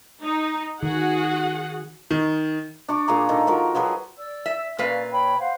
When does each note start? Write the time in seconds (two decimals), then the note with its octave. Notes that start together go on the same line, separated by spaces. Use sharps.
0.24 D#4
0.83 D#3 F#4 G#4 F#5
2.11 D#3
2.88 D4 C#6 D6
3.08 A#2 F4 G#4 A#5
3.29 D#3 A4
3.47 F3 F4 F#4 A#4
3.75 F3 F#3 G#4 B4
4.18 D5 E6
4.46 E5
4.79 A#2 C#4 B4 D5 F5
5.12 C#5 G5 B5
5.39 C5 F5 F#5